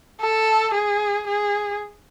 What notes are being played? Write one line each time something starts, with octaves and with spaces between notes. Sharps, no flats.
A4
G#4
G#4